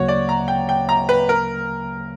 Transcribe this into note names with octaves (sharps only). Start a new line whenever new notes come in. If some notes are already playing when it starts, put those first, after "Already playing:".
Already playing: D2 C#3 F#3 A#3 F#4 C#5
D5
A#5
G5
G5
A#5
B4
A#4